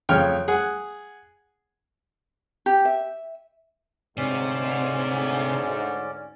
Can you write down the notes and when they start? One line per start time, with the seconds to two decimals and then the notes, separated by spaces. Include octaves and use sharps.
0.09 F2 C#3 C#5 G5 F6
0.48 G#4 F#5
2.66 G4
2.85 E5
4.17 D2 G#2 C3 C#4 D5